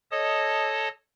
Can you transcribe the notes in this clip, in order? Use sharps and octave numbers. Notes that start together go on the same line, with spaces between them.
A4 C#5 D#5 A5 D#6